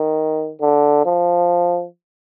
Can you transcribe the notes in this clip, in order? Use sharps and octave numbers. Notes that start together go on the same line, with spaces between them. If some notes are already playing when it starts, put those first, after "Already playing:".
Already playing: D#3
D3
F3